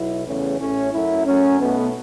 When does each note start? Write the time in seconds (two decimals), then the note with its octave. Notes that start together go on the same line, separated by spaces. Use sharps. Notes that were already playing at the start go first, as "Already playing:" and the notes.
Already playing: B1 B2 F#3 E4
0.26 E2 C#3 E3 A3 C#4
0.59 A1 A2 A3 C#4
0.92 F#2 F#3 A3 E4
1.25 F#2 F#3 A3 C#4
1.59 B1 B2 A3 B3